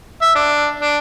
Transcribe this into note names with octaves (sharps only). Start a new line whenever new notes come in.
E5
D4
D4